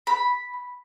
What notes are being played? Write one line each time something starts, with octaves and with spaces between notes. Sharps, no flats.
B5